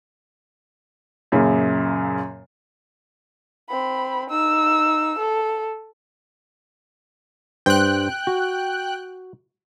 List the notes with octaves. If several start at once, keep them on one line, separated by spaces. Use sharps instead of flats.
F#2 A#2 C#3
C4 B5
D#4 E6
A4
G2 C5 G5 F#6
F#4